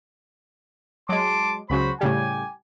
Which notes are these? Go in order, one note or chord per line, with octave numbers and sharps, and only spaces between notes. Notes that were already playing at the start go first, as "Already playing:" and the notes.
F#3 G#3 A5 C6 D6
C#2 C#3 F#3 F#4 C5 B5
A2 C#3 G3 G4 G#5